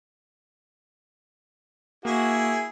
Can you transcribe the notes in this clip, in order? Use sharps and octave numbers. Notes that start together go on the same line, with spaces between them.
A#3 E4 F#4 G#4